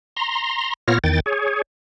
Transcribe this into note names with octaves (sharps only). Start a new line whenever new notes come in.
A#5 C6
A#2 B3 F4 C#5 F6 A#6
E2 D#3 G5 A6
G#4 C#5